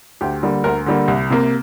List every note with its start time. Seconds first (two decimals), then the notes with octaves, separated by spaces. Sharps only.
0.21 D2 G4
0.42 D3 G3 A#3
0.64 D2 A#4
0.86 D3 G3 A#3
1.08 C2
1.30 C3 A#3